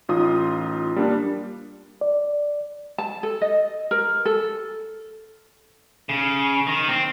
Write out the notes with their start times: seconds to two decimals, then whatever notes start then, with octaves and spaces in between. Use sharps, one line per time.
0.09 A1 D#4 F4 D#6
0.96 G3 A#3 D4
2.01 D5
2.98 A5
3.23 A4
3.41 D#5
3.91 A#4
4.25 A4
6.09 C#3
6.67 D#3
6.88 C4